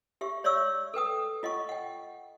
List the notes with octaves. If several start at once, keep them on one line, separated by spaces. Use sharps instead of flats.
G4 E5 C#6
C#5 D5 E5 C#6 E6
A4 B4 G5 D#6
F4 D#5 F#5 C#6
F#5 G5